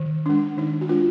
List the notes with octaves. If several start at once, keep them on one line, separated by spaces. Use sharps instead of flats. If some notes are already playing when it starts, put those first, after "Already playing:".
Already playing: D#3
G#3 D4
D#3 D#4
F#4
G#3 D4 F4